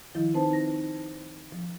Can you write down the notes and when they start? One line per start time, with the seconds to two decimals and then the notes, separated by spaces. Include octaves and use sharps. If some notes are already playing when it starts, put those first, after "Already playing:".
0.15 D#3 F3 E4
0.34 C4 D#4 B4 C5 A5
0.53 A#6
1.52 F3